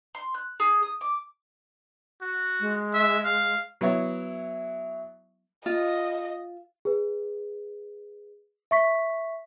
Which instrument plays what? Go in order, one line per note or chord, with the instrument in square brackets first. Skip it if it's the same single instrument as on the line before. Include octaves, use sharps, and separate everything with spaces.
[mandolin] C6
F#6
G#4
D#6
D6
[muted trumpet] F#4
[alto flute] G#3
[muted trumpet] E5
F5
[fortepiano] F#3 B3 E4 C#5
[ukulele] F4 [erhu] D#5
[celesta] G#4 B4
E5 C#6 B6